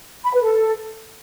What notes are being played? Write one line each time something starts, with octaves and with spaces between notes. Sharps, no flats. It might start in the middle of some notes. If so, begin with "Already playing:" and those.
B5
B4
A4